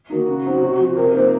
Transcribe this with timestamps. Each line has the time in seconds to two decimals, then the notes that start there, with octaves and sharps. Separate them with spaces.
0.10 D#3 A#3 D#4 F#4
0.27 C#3
0.45 F#3 C4 D#4
0.62 C3
0.79 F3 C4
0.96 C3 A#4
1.14 F3 A#3 D#4 C5